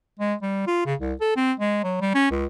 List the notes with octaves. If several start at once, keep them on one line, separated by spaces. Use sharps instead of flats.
G#3
G3
F4
C#3
C2
A4
C4
G#3
F#3
G3
C#4
C#2